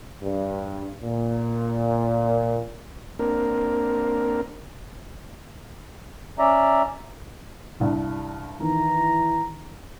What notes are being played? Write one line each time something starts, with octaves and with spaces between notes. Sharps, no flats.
G2
A#2
A#3 C4 D4 A#4
C#4 D5 E5 A#5
C2 G2
D#3 E3 A#5